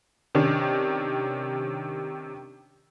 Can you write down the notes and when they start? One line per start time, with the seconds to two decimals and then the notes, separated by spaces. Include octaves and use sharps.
0.35 C3 D#3 C#4 D4